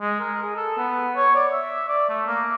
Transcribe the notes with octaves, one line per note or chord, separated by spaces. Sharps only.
G#3
A#4
G#4
A4
B3
C#5
D5
E5
D5
A3
A#3